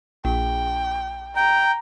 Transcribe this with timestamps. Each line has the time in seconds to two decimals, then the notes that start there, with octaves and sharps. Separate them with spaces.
0.25 A#1 G5
1.36 G5 A#5